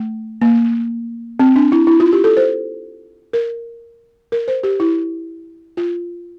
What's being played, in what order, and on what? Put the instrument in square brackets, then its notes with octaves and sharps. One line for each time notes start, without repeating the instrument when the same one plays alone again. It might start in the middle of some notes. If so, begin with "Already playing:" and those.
Already playing: [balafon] A3
A#3
C4
D4
E4
E4
F4
G4
A4
C5
A#4
A#4
C5
G4
E4
F4